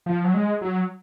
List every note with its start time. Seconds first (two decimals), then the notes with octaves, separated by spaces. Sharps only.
0.06 F3
0.24 F#3
0.34 G#3
0.61 F#3